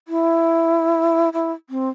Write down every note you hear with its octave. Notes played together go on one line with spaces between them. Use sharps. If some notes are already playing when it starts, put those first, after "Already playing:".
E4
E4
C4